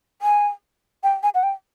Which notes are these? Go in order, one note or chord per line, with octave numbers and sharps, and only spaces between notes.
G#5
G5
G#5
F#5
G5